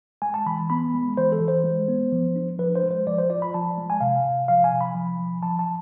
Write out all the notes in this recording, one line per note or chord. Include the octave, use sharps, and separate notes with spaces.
G#3 G#5
A5
E3 B5
B3 B5
G#3
E3 C5
A4
E3
C5
G#3
B3
F3
D4
F3 B4
C5
G#3
C5
F3 D5
C5
F4 D5
B5
F3 A5
G#3
G#5
C3 F5
C3
F3 F5
G#5
C3
B5
F3
F3
F3 A5
A5